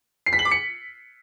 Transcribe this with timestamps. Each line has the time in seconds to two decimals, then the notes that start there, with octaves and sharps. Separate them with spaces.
0.26 C7
0.33 B6
0.39 F#7
0.45 D6
0.51 C#7